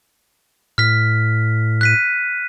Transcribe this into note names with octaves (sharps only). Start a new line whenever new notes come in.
A2 F6 B6
F#6 B6 D#7